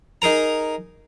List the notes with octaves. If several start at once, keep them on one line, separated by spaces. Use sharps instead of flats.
D#4 G#4 A#4 A#5